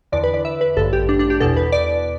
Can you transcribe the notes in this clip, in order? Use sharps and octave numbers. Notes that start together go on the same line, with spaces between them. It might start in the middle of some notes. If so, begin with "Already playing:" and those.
E2 D3 D5
B4
D5
E5
B4
A1 G2 D3 A4
G4
D4
D4
G4
E2 B2 A4
B4
D5